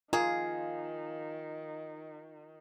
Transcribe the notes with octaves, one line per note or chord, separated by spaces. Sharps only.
D#3 A#3 F4 G#4